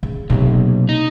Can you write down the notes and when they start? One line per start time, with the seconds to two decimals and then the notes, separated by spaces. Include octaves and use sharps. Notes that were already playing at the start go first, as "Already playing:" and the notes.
0.03 C#3
0.30 B1 C3 A#3
0.89 D#4